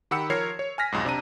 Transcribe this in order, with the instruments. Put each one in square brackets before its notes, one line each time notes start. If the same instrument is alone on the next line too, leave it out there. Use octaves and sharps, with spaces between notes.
[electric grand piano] D#3 G4 F#5 B5 E6 C#7
F3 A#4 C#5 E6 G#6 C7
C#5
G#5 F6 A#6 B6
B1 F2 G#2
C3 D4 A#5 D#7